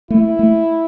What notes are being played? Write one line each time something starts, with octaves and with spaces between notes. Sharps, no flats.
A3 E4
A3